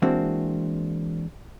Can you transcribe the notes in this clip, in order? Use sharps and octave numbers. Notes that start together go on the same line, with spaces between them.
E3 G#3 A#3 C4 D4 F#4